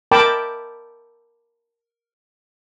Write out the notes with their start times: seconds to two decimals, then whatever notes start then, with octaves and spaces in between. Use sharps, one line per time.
0.11 A#4 G5 A5 B5 D6